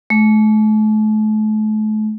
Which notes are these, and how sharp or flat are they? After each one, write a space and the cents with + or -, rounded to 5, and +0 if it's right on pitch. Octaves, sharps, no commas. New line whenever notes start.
A3 -40